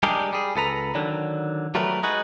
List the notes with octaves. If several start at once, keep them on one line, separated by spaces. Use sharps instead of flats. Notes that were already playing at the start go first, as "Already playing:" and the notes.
G3 G#3 D4 G4 G#4 A#4
G3 G#4
C#2 A4 B4 A#5
D3 D#3 F#3 D4
F#3 G3 A3 B3 A#4 B4
G#3 D#4 F#4 G#4 B4